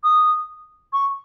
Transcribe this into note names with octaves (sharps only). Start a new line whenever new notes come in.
D#6
C#6